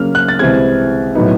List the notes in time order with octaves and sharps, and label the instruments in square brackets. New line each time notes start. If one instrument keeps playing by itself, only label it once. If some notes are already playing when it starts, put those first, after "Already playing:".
Already playing: [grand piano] C#3 F#3 A#3 C#4 F6
F#6
A6
C2 C3 E3 G#3 C4 G#6
A2 F#3 B3 D#4